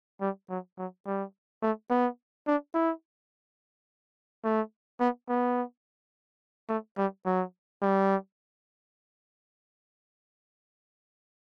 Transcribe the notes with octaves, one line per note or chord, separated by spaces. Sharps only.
G3
F#3
F#3
G3
A3
B3
D4
E4
A3
B3
B3
A3
G3
F#3
G3